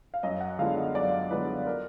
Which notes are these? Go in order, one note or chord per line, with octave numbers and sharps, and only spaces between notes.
F5
F#2 D#5
F#5
D3 G#3 B3 F4 F5
D#5
F#2 D5
D3 G#3 B3 F4 B4
A#4